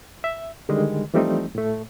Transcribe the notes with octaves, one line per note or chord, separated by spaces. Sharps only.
E5
D3 D#3 G3 G#3
E3 F3 G3 A3 C4 D#4
A2 A3